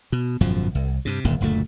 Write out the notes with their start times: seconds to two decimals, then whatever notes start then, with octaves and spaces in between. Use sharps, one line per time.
0.12 B2
0.41 G#1 F#2 B2 F3
0.75 C2
1.05 G2 C3
1.25 D1 G1 D#2 A#2
1.41 F#1 D2 A#2 A3